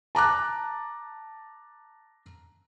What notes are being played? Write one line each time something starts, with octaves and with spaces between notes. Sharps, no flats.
A5 A#5 D6 F#6